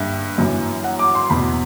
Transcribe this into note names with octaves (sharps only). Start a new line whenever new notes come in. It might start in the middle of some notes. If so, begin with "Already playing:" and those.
Already playing: G2 D3 E5
F#2 E3
F#5
D6
C6
E2 B2 B5